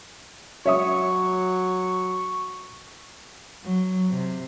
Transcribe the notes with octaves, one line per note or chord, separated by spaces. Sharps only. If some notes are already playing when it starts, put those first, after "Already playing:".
F#3 C#5 E5 C#6 D#6
F#3
C3